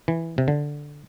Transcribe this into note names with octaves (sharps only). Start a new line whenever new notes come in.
E3
C3
D3